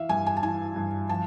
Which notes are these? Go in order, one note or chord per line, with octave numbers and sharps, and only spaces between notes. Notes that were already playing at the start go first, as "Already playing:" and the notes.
Already playing: E3 E5 F5
G2 G#5
G#5
A5
E3 G#5
G2
F3 A5